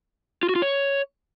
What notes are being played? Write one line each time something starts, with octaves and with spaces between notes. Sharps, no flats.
F4
F#4
F4
C#5